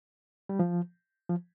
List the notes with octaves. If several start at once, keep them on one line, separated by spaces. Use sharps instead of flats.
G3
F3
F3